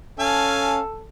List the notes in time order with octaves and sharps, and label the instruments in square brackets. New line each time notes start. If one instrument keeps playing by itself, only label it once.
[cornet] C#4 [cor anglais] A4 [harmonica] F5 G#5 A5